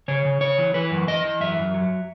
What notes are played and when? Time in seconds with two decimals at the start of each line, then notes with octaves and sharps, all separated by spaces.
0.08 C#3 C#5
0.25 C#3
0.41 C#3 C#5
0.58 E3
0.74 E3 B4
0.91 F#2
1.07 E3 D#5
1.24 E3
1.41 F#2 E5
1.58 F#2
1.74 F#3